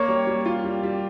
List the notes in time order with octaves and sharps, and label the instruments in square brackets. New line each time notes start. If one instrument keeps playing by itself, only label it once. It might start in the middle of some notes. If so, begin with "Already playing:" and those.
Already playing: [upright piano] A#3 [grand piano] C#5
[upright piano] G3
G3
F4
G3
G3